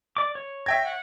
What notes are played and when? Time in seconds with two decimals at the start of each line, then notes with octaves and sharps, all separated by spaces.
0.17 D5 D6
0.35 C#5
0.66 E5 G5 G#6 A#6
0.83 F#5